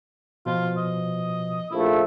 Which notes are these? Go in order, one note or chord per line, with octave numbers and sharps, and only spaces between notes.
B2 F3 F4
D#5
A#1 F3 A3 E4